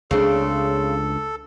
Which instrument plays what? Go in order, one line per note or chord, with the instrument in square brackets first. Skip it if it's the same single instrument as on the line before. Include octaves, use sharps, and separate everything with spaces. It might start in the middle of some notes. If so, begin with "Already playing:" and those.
[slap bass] C#2 F#3 D4 [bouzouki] C#3 C4 [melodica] A4